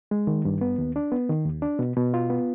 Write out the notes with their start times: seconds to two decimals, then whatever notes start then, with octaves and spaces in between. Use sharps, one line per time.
0.11 G#3
0.27 D#3
0.45 G2
0.61 B3
0.78 D#2
0.96 D4
1.12 B3
1.29 D#3
1.45 D#2
1.62 D4
1.79 B2
1.96 B2
2.14 F4
2.30 B3